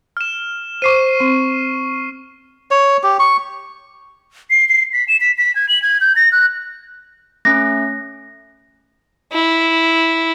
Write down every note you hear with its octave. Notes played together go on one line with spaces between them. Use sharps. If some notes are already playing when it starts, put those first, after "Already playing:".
F6 E7
C5 C#6 D6 C7 D#7
C4
C#5
G4
C#6
C7
C7
B6
E7
B6
B6
G#6
F#7
G#6
G6
A#6
F#6
A3 C#4 A#6
E4